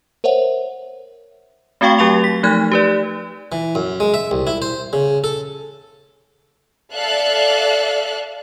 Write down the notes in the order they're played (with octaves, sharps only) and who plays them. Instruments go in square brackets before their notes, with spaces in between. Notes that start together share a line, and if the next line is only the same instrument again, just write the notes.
[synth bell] A#4 C5 C#5 E5 F#5
A3 C4 F#4 F5 G5 C#6
F#3 G4 G5 C#6 F7
B6
F3 A3 D#4 F#6 G#6
G4 B4 D5
[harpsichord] E3
F#2
G#3
E5
C2
E4
C5
C#3
A4
[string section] A4 D5 E5 F5 F#6